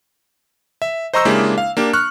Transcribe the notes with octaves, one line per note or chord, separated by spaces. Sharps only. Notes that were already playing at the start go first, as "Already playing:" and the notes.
E5
C5 D#5 A#5 C#6 E6 G6
C#3 G#3 A#3 D4 E4 G4
F5
A#3 D4 G4
C#6 F6 F#6